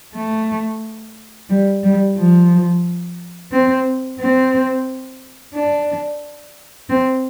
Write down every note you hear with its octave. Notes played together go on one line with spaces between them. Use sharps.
A3
G3
G3
F3
C4
C4
D4
C4